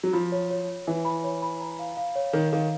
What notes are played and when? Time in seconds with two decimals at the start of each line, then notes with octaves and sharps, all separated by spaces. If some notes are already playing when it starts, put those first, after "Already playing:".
0.03 F#3
0.13 F3 B5
0.32 C#5
0.51 C#5
0.68 C#5
0.87 E3 C#5
1.05 B5
1.24 C#5
1.42 B5
1.61 A#5
1.79 F5
1.97 F5
2.15 C#5
2.33 D#3 C#5
2.53 D#3 F5